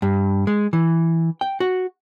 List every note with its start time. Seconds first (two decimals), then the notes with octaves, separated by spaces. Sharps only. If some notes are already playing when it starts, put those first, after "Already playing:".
0.02 G2
0.47 G#3
0.73 E3
1.41 G5
1.60 F#4